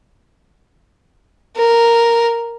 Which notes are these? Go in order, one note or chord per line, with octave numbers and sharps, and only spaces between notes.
A#4